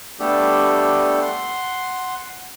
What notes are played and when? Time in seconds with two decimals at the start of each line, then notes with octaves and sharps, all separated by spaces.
0.20 G3 A3 B3 D4 G4 A4
1.22 F#5 C6